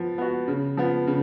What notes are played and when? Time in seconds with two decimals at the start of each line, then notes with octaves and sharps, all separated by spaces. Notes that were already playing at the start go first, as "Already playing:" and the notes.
Already playing: F3 B3
0.18 B3 F#4
0.48 C#3
0.77 F3 B3
1.07 C#3